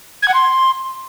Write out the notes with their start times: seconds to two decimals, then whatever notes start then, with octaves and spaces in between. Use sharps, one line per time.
0.22 G#6
0.28 F#5
0.34 C6